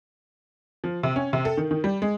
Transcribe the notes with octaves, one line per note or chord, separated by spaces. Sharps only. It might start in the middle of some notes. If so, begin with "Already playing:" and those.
F3
C3
C#4
C3
A4
D#3
D#3
G3
G#3